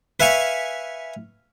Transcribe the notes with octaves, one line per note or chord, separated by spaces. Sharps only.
B4 E5 F5 G#5 C#6